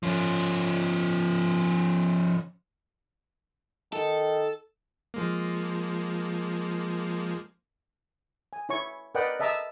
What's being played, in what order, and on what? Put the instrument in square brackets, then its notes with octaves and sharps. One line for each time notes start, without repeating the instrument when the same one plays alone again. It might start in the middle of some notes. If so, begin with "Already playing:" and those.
[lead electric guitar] F3 C#4
[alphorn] D#3 [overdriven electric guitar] A4
[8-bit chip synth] F3 G#3 A#3
[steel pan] G#5
E4 C#5 C#6
A#4 B4 D5 D#5 F#5 G5
D#5 E5 A5 A#5 D6 E6